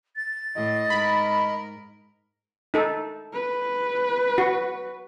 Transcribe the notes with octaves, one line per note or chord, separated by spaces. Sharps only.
A6
A2 D#5
G#2 A#4 B5
D#4 A4
B4
F#4